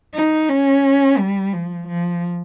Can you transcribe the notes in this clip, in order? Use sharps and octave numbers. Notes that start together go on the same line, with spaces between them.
D#4
C#4
G3
F3
F3